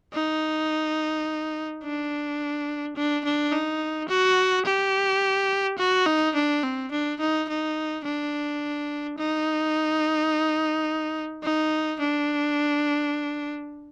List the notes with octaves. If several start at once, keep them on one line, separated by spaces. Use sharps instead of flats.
D#4
D4
D4
D4
D#4
F#4
G4
F#4
D#4
D4
C4
D4
D#4
D#4
D4
D#4
D#4
D4